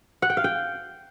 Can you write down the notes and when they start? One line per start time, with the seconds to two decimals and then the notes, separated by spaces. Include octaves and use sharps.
0.22 F#5
0.30 G5
0.37 F5
0.44 G5